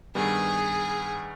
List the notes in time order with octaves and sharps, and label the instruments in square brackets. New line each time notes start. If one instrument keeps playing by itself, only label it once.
[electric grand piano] G2 D#3 G3 B3 [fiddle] G#4